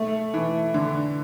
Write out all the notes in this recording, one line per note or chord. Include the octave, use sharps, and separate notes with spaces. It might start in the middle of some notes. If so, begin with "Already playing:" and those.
Already playing: A3
E3
D3